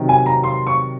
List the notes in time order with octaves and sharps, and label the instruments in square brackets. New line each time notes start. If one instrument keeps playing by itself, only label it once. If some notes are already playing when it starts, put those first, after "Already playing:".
Already playing: [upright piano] C3 D#3 F#3
G#5
A#5
C6
C#6